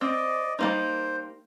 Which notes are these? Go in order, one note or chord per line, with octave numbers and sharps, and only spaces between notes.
C4 D5 D#5
G3 A#3 D#4 C5